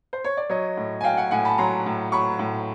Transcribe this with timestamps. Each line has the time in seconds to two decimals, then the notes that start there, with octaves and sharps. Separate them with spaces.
0.13 C5
0.24 C#5
0.37 D5
0.50 F#3 C#5 D#5
0.77 A2
1.01 G#5
1.04 F#3 F5 G5
1.17 F#5 G#5
1.31 A2 F#5 G#5
1.45 A5 B5
1.58 F#3 A#5 C6
1.86 A2
2.12 F#3 B5 C#6
2.39 A2